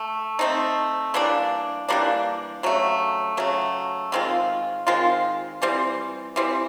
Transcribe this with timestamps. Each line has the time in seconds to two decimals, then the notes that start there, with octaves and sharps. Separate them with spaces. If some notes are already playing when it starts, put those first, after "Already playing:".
Already playing: A3
0.39 A3 C4 D#4
1.14 E3 G3 A#3 D4
1.88 E3 G3 A#3 D4
2.63 C#3 F#3 A3
3.37 C#3 F#3 A3
4.12 D#3 G#3 C4 F4
4.87 D#3 G#3 C4 F4
5.62 E3 G3 C4
6.36 E3 G3 C4